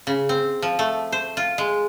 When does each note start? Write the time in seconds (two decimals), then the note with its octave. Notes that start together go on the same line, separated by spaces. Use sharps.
0.07 C#3
0.29 C4
0.62 F3
0.79 A3
1.12 C5
1.37 F4
1.58 G#3